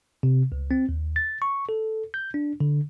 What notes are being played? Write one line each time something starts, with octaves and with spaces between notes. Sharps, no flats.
C3
C#2
C4
D#2
A6
C#6
A4
G6
D4
D3